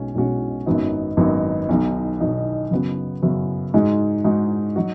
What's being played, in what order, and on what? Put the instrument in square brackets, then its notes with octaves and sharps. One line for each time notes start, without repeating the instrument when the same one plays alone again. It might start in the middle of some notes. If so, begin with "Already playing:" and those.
Already playing: [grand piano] B1 B2 G#3 C#4 F#4
B1 B2 G#3 C#4 F#4
G#1 F#2 F#3 B3 D#4
G#1 F#2 F#3 B3 D#4
B1 B2 F#3 D#4
B1 B2 F#3 D#4
F#2 C#3 B3 F#4
F#2 C#3 B3 F#4
G#2 G#3 D#4 F#4
G#2 G#3 D#4 F#4
F#3 D#4 F#4